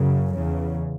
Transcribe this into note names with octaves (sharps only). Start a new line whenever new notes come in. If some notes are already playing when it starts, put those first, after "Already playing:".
Already playing: F#2 C#3
E2 C#3